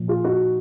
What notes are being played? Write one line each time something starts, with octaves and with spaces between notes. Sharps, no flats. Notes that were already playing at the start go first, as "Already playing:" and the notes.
Already playing: A#2 F3
F4 G#4
D#4 F#4